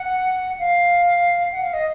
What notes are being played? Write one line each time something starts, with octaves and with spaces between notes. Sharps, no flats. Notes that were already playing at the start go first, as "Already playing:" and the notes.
Already playing: F#5
F5
F#5
F5
D#5